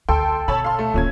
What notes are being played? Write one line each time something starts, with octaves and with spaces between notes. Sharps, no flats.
D2 A4 G5 C6
B2 C#5 A5 B5
F5 C6
A3
D1 A#2 D#3 C#4 G#6